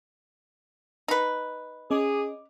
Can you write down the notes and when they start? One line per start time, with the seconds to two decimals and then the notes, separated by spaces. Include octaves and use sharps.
1.08 D#4 B4
1.91 C#4 G#4 D#5 D6